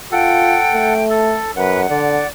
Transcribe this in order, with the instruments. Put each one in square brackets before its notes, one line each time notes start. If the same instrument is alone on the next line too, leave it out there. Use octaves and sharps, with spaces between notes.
[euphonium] F4 [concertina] A4 F#5 [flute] G5
[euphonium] A3
[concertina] A4
[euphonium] F#2 [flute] B4 [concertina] F#5
[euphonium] D3 [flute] D5